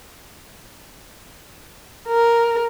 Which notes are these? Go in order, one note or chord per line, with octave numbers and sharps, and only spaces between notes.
A#4